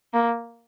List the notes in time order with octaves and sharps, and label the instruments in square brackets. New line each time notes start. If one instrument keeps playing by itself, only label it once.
[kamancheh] A#3